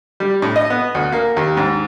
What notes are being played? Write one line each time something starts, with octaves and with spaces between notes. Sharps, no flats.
G3
A2
D#5
B3
D2
A#3
D#2
G#2